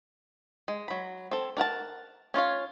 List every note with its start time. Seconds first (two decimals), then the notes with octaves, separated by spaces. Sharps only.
0.68 G#3
0.88 F#3 B5
1.31 C4 A4
1.57 D4 A#4 F#5 A5
2.34 C#4 F4 C#5 F5